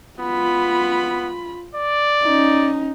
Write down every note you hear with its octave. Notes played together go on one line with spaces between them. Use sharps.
B3 F4 B5
D5
C#4 D#4